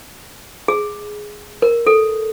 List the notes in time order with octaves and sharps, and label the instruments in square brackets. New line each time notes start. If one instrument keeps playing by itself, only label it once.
[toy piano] G#4
A#4
A4